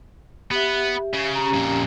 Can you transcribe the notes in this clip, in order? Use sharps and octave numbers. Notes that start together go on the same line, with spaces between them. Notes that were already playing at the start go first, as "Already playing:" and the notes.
B3 G4 E5
C#3
C#4 G4 A#5
F2 A#2